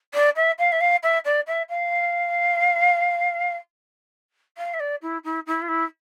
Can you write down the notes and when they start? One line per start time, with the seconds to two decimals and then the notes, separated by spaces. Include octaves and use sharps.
0.14 D5
0.36 E5
0.59 F5
0.72 E5
0.81 F5
1.03 E5
1.25 D5
1.47 E5
1.69 F5
4.58 F5
4.74 E5
4.80 D5
5.02 E4
5.24 E4
5.47 E4
5.62 F4
5.69 E4